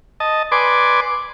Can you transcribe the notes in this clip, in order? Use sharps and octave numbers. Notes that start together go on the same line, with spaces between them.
D#5 A5
B4 D5 G#5 C6 D6